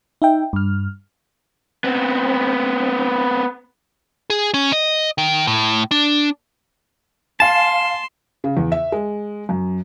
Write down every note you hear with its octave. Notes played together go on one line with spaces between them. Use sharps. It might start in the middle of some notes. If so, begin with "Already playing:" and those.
D#4 E5 G5
G2 F6
B3 C4
G#4
C#4
D#5
D#3
A2
D4
F5 G#5 A5 C6 E7
C#3
E2
E5
G#3
F#2